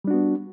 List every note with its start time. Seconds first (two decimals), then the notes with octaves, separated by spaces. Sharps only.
0.04 G3
0.07 D4
0.11 F#4
0.14 B3